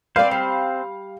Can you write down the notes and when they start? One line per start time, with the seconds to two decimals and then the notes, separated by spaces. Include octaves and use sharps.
0.16 C4 B4 C5 D5 F5
0.31 G3